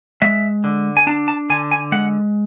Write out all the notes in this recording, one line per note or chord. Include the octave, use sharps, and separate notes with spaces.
G#3 E5
D3
G#5
D4 A5
A5
D3 G#5
G#5
G#3 F#5